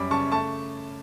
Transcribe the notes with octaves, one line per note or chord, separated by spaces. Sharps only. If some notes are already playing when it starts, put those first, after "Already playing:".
Already playing: F#2 G3 B5 D6
C#3 A5 C#6
A3 A5 C#6